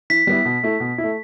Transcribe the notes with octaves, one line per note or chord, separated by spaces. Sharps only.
E3 B6
G3 B3 E4
B2
A3 E4
B2
A3 E4